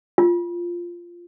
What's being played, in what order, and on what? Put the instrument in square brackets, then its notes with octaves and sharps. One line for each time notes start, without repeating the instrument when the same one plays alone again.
[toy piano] F4